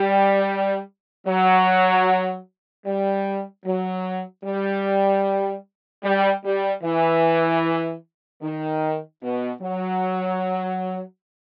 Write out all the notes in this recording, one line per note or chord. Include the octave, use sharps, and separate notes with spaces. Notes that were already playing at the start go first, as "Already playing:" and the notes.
Already playing: G3
F#3
G3
F#3
G3
G3
G3
E3
D#3
B2
F#3